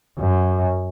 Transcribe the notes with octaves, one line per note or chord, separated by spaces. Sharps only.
F#2